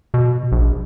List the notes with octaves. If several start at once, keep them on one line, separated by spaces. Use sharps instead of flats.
B2
A#1